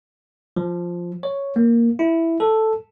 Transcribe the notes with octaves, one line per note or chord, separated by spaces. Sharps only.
F3
C#5
A#3
E4
A4